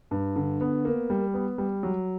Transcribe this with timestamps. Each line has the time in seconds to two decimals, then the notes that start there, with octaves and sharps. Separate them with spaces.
0.11 G2
0.36 D3
0.61 B3
0.85 A#3
1.10 G3
1.34 B3
1.58 G3
1.83 F#3